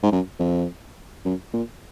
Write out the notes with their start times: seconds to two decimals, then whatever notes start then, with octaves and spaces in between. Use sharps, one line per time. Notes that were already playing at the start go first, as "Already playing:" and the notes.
0.03 G#2
0.12 F#2
0.40 F2
1.25 F#2
1.54 A#2